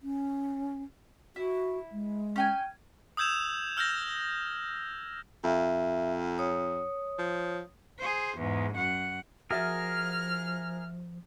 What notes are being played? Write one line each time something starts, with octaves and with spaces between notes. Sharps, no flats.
C#4
E4 F#4
G#3
C#4 G5 G#5
D#6 E6 G6 G#6 E7 F7
E6 F6 G6 G#6 A#6
F2 E5
C#5 D#6
F3
G#4 C5
E2 G#2
F#2 F#5
F3 F#4 G#4 A#4 E5 F6 A6